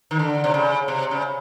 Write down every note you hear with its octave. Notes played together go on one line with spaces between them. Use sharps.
D#3
D3
C3
C#3
C3
C#3